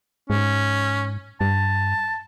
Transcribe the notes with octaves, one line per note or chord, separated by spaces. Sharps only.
G#2 C#4
G2 A5